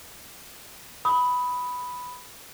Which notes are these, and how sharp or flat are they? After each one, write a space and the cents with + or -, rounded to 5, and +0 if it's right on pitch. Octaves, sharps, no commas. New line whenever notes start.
B5 +0 D#6 +25